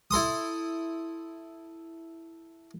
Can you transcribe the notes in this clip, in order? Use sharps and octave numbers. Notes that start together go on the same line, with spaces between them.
E4 A4 C6 D#6